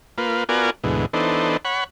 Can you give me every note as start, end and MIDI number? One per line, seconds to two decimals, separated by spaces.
0.18 0.44 58
0.18 0.44 65
0.18 0.44 71
0.49 0.70 59
0.49 0.70 65
0.49 0.70 66
0.49 0.70 70
0.49 0.70 74
0.49 0.70 80
0.84 1.06 38
0.84 1.06 44
0.84 1.06 47
0.84 1.06 52
1.13 1.57 52
1.13 1.57 59
1.13 1.57 62
1.13 1.57 63
1.13 1.57 69
1.13 1.57 72
1.65 1.84 73
1.65 1.84 78
1.65 1.84 83